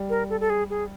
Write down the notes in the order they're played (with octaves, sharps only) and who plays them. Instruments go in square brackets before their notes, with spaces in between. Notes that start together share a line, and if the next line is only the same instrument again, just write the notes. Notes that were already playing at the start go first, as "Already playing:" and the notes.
Already playing: [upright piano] G3
[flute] A#4
A4
A4
G#4
G#4